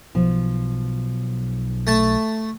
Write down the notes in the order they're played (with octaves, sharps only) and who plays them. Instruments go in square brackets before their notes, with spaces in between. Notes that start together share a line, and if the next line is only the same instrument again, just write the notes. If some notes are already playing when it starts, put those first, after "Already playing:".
[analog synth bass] B1 [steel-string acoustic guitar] F3
[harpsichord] A3 A5